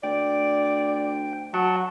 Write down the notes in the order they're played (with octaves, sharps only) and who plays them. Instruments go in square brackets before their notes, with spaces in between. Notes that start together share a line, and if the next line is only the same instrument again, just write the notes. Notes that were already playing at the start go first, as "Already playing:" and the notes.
[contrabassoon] D2 [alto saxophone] D5 [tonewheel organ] G5
[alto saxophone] F#3 [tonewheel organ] F#5 A5